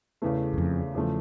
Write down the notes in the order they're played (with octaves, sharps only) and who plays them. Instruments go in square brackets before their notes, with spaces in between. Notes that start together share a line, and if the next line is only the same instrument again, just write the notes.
[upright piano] E2 C#3 E3 A3
[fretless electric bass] F#2
F2
[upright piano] E2 C#3 F3 A3